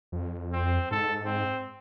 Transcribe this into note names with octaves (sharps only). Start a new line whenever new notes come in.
F2
C4
G#2 A4
C4